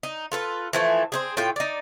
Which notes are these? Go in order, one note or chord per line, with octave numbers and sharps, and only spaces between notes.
D#4
F4 A4 B4
E3 F3 A3
C4 D#4 G#4
A2 F4 G5
D#4 D5